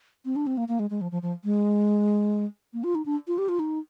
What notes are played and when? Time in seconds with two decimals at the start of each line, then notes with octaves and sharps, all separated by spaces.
0.25 C4
0.36 D4
0.47 C4
0.57 A#3
0.68 A#3
0.79 G#3
0.90 G#3
1.01 F3
1.12 F3
1.22 F3
1.44 G#3
2.73 A#3
2.84 F4
2.95 D#4
3.06 D4
3.28 F4
3.38 G4
3.49 F4
3.59 D#4